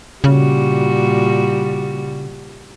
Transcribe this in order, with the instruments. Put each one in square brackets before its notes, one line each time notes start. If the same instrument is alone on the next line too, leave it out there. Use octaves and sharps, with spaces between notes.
[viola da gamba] A#2 G3 F#4 [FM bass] C#3